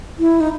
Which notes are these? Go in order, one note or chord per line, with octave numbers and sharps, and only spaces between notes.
E4
D#4